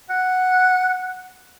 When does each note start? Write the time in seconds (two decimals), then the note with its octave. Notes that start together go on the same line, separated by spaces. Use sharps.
0.10 F#5